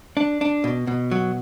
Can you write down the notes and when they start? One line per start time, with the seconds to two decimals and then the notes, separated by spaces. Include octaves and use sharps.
0.17 D4
0.41 D4
0.64 B2
0.87 B2
1.11 F#3